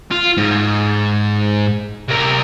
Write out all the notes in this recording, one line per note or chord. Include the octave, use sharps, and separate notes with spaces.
F4
G#2
C3 A#4